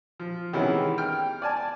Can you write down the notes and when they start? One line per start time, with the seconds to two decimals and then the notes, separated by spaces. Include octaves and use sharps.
0.20 F3
0.53 C3 D#3 E3 G#3 B3 C#4
0.98 G5 F6
1.42 D5 G#5 A5